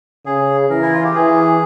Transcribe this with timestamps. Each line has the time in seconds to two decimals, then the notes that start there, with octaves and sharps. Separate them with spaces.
0.26 C#3 G#4
0.70 E3 A#4
0.82 E4
0.93 F4
1.04 G4
1.15 E3 G#4